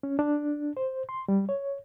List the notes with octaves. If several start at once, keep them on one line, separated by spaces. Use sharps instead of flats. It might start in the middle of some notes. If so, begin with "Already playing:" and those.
C#4
D4
C5
C6
G3
C#5